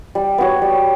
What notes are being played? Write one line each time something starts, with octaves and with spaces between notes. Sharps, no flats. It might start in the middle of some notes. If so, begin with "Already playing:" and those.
G3
B3 F#4 C#5
G3